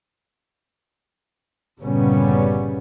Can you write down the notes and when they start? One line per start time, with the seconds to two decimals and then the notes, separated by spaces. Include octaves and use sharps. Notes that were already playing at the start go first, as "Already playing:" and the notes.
1.80 G1 A#2 C#3 G3 B3 C#4